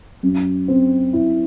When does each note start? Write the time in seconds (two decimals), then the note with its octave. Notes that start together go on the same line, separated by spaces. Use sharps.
0.23 F#2
0.68 C4
1.13 E4